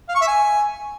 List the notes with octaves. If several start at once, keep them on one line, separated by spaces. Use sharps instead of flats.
F5
C#6
E5
G#5